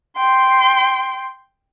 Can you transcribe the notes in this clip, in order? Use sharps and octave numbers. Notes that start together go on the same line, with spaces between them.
G5 C6